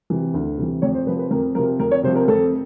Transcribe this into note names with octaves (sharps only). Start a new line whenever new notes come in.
C3 E3
D2
C3 E3
F2 C#5
C5
C3 F3 B4
B4
F2 A#4
C3 F3 A#4
F2 A#4
C#5
C3 F3 C5
A#4
F2 A4